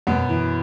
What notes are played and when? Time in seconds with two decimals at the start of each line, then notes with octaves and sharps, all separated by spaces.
0.07 F#2 B2 B3
0.29 E3